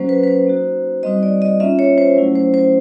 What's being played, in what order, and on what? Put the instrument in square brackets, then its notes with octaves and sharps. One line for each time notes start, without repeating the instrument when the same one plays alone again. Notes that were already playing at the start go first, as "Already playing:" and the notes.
Already playing: [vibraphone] F#3 A#3 C#4 F#4 C5
B4
B4
C5
A#3 D#4 F#4
G3 C4 D#4 F#4 D#5
D5
D#5
A#3 C#4 F4 E5
C#5
C5
F#3 A3 C#4 E4
C5
C5